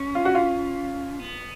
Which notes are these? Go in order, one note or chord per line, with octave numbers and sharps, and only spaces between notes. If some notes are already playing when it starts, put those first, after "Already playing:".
Already playing: C#4
F4
F#4
F4
B3